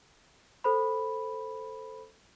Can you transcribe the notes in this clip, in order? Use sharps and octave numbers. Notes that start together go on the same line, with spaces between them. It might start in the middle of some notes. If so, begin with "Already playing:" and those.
A4 C5 B5